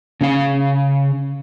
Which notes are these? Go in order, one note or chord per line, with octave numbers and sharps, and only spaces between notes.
C#3 C#4 F5